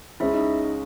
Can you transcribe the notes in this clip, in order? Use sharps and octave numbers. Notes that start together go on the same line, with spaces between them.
C#2 C#3 G#3 C#4 E4 E5
D#4 D#5